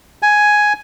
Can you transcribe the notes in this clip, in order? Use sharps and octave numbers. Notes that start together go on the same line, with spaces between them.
G#5